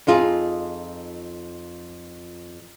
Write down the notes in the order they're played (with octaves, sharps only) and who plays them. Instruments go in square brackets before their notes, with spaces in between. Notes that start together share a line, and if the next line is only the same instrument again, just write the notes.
[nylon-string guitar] F2 D#4 F4 G#4